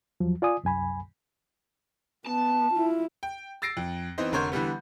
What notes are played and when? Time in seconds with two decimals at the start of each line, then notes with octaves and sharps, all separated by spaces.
0.20 E2 F3 F#3
0.42 F4 D5 G#5 D#6
0.64 C2 F#2 G#5 B5
2.27 B3 A5
2.73 E4 F4
3.23 G5
3.62 E6 A6 A#6 C7 D7
3.77 F2
4.18 E3 B3 C4 D#4 C5 D#5
4.32 F1 D3 A#4 C#5 C6 G6
4.52 D3 E3 G3 B3